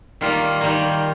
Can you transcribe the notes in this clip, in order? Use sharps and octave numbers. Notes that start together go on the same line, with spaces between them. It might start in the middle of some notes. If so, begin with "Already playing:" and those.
D#3 G3 A#3 F4
D#3 G3 A#3